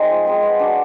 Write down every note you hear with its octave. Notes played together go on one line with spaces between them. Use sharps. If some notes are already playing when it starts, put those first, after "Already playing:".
Already playing: G#3 C4 D#4
F3
G#3 C4 D#4
B3
D4 F#4